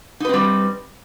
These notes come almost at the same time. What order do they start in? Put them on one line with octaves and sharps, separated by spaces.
D#4 B4 C4 G3